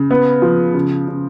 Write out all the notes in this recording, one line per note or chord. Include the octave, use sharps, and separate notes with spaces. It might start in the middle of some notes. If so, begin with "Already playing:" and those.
Already playing: C#3
B3
F3
C#3
C#3